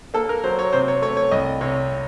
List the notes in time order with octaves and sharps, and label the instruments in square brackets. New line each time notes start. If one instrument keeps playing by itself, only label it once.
[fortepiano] A#3 A4
A#4
F#3 C5
C#5
C3 C5
C#5
A3 C#5
C#5
C2 D#5
C3 C#5